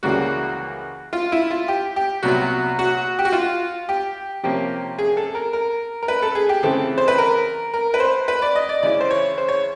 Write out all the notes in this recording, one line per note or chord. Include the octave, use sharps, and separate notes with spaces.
C#2 C#3 E3 G3 A#3 F#4
F4
E4
F4
G4
G4
C2 A#2 F#3 B3 F#4
F#4
G4
F#4
F4
G4
C3 F3 A#3 C#4 G4
G#4
A4
A#4
A#4
A#4
B4
A4
G#4
G4
C#3 E3 A3 C4 A4
C5
B4
A#4
A#4
B4
C5
B4
D5
D#5
D5
C#3 E3 G#3 C#4 E4 D5
C5
C#5
C5
C#5